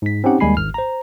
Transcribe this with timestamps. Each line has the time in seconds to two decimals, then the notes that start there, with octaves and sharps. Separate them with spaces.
0.02 G#2 B6
0.24 C4 C#4 D#4 G4 F#5
0.40 D#2 G3 G#3 G#5 B5 C7
0.57 G#1 F6
0.74 C5 A#5